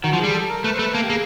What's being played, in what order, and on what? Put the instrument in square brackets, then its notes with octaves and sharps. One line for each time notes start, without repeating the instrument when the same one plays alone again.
[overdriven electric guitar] D#3 [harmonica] F#4
[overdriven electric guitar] F3
[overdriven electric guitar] G3 [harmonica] G#4
[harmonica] A4
A#4
[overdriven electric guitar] A3 [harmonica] B4
[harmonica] C5
[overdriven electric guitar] A3 [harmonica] B4
[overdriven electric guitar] A#3 [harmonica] A4
[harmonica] G4
[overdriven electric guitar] A#3 [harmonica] G#4